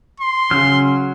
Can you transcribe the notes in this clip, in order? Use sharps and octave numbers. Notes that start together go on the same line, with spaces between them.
C6
C#3 F#3 C#4 F6